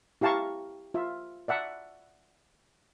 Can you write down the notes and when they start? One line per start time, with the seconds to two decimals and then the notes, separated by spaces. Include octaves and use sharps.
0.21 E4 G4 F5 A5 A#5 C#6
0.94 F4 E5
1.48 D5 E5 F#5 A5